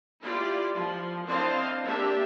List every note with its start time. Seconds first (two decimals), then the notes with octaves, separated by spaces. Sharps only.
0.22 E4 F4 G4 D5
0.74 F3
1.26 C4 D4 E4 C5 D#5 F5
1.84 A#3 D4 G4 E5